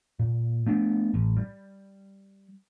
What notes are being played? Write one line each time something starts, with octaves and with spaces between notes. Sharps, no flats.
A#2
A3 B3 D4
A1
G3